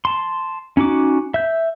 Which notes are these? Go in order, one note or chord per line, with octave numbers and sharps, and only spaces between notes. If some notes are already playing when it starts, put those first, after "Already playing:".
A5 C6
C#4 D#4 F#4 D6
E5 G6